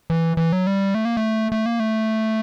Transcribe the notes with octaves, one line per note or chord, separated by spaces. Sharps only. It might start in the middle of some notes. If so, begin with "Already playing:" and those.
E3
E3
F#3
G3
A3
A#3
A3
A3
A#3
A3